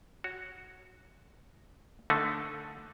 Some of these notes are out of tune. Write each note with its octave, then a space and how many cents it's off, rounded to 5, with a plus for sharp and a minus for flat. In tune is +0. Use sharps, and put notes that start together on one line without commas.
F#4 +0 C#5 +0
D3 +0 A3 +0 D#4 +10